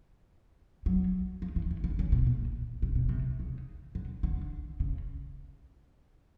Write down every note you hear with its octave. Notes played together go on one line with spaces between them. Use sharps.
F#3
F3
E3
D#3
D3
C#3
B2
A#2
C3
B2
C3
C#3
D3
D3
C#3